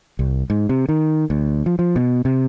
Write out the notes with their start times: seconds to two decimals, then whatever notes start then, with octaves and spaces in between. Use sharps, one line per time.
0.19 C2
0.50 G#2
0.69 C3
0.89 D#3
1.30 D2
1.66 F3
1.79 F3
1.96 B2
2.25 C3